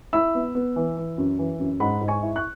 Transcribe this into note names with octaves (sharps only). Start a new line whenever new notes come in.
E4 B5 E6
B3
B3
E3
E3
F#2
E3
F#2
G#2 F#5 B5
G#2
G#5 C#6
E4
C#6 F#6